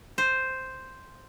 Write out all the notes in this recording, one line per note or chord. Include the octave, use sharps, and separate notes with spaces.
C5